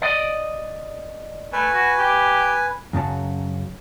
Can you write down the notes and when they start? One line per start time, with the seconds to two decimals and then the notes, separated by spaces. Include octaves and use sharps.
0.02 D5 D#5
1.53 A3 B4 G#5
1.73 F#4
1.99 G4
2.93 F#2 C#3 F#3 A5